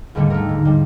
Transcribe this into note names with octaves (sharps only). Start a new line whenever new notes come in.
D#2 G#2 D3 G3 A3
A3 A#4
G#2
G#2 G3